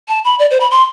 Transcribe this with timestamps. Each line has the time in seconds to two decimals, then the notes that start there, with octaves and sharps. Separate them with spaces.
0.08 A5
0.25 B5
0.39 D5
0.51 C5
0.60 B5
0.71 C6